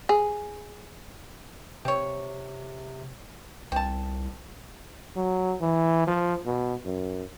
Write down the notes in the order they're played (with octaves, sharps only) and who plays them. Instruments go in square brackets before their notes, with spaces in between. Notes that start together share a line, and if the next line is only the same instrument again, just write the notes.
[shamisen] G#4
[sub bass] C3 [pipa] C4 C#5
[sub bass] C2 [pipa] C4 A5
[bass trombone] F#3
E3
F3
B2
F#2